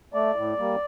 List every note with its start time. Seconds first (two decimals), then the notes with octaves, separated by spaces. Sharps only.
0.14 A3 D5
0.36 A2
0.58 G3 A#3